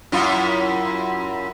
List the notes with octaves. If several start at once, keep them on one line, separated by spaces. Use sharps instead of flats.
F#2 E4 F4